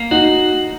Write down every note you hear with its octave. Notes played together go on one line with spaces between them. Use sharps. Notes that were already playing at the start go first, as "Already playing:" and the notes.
Already playing: A#3
D#4 F#4